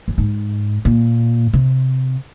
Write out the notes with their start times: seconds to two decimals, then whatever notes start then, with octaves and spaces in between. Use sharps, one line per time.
0.08 F#2
0.18 G#2
0.85 A#2
1.53 C3